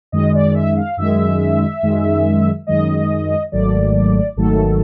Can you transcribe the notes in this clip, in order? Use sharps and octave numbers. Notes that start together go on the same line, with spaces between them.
F#2 D#3 G#3 D#5
D5
E5
F5
F#2 D#3 G#3 E5
F#2 D#3 G#3
F#2 D#3 G#3 D#5
G#1 G#2 D#3 F#3 A3 D5
G#1 G#2 D#3 F#3 A3 A4